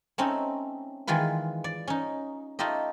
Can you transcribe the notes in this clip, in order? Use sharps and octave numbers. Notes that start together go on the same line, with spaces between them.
A3 C4 C#4 D#4
D#3 E3 G#3 F4 B4
D5
C#4 D#4
A3 D#4 F4 G4 D#5